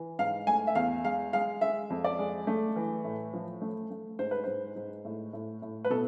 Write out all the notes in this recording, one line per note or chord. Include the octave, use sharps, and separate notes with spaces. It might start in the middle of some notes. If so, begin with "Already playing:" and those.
Already playing: E3
G#2 F5
A3 G#5
E5
E2 F5
G#3 F5
G#3 F5
G#3 E5
F2
D5
G#3
A3
E3
A2
F3
A3
A3
G#2 C5
B4
G#2 C5
G#2
A2
A2
A2
B4
B2 A4